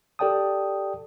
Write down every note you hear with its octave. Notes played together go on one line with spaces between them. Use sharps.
G4 A4 D5 G5 A5 D#6